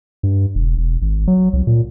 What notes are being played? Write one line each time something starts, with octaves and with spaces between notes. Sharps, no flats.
G2
E1
E1
G#1
F#3
C2
A#2